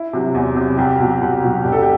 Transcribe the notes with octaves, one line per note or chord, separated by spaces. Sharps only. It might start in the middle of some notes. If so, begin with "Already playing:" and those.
Already playing: E4
C3 F#3
E2
C3 F#3
C2 G4
B2 F#3
C2
B2 F#3
E1 G4
A4
G4